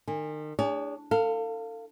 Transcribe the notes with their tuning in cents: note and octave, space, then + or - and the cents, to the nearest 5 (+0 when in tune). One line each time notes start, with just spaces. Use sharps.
D#3 -35 G#5 -30
D4 +0 G#4 -30 C#5 +40
A4 +35 F5 +0